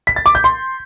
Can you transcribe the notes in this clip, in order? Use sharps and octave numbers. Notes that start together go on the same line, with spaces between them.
B6
A6
D6
G6
C6